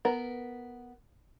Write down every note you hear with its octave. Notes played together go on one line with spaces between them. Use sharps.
B3 A#4